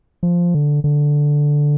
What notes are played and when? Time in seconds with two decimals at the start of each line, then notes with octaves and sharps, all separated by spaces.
0.23 F3
0.54 D3
0.84 D3